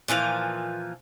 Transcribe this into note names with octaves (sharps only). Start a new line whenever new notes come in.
A#2 E3 F3 F5